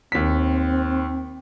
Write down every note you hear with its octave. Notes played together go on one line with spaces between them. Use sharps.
D#2 C4 B6